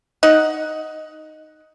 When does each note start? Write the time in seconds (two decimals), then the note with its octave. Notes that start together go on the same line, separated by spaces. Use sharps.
0.23 D#4 F#5